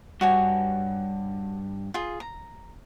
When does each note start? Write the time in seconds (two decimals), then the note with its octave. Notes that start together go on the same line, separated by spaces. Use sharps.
0.21 G2 F#4 C#5 G#5
1.94 F4 G#4
2.20 A#5